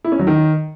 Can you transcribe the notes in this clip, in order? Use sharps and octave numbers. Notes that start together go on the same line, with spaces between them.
E4
C#4
F#3
D#3